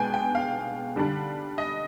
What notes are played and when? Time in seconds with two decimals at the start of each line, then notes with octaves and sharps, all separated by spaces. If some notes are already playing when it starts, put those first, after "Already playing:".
Already playing: B2 G#3 B3 D4 G5 G#5
0.14 G5
0.35 F5
0.96 D3 G3 D4
1.58 D#5